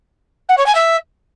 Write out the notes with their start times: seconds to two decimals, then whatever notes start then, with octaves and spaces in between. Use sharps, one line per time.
0.49 F#5
0.57 C#5
0.66 G#5
0.75 E5